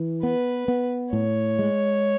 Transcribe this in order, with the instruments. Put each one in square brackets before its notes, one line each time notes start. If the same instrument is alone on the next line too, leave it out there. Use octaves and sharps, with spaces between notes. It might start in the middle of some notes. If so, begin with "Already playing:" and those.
Already playing: [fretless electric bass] E3
[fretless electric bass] B3 [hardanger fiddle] B4
[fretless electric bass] B3
[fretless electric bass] A2 [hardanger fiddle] C#5
[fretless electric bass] G#3